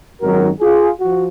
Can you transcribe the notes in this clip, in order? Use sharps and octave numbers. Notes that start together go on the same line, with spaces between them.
G#1 F#2 D#3 F#3 F#4 A#4
F4 G#4
F3 F#4